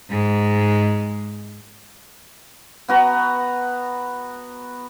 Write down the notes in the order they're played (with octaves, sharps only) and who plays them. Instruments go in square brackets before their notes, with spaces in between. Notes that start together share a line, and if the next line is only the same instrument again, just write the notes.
[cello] G#2 G#3
[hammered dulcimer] B3 F#4 A#5